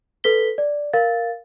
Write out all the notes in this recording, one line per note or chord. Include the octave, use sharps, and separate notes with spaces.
A4 B4 B6 G7
D5
A#4 F5 A6